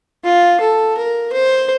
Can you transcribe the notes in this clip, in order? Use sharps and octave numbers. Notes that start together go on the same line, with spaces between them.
F4
A4
A#4
C5